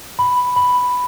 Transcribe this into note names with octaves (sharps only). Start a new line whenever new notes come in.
B5
B5